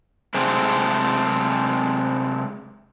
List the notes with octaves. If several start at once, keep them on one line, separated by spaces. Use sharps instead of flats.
C3 G#3 A3 C4 D4